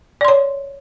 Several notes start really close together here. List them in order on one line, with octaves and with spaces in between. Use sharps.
D5 C6 C#5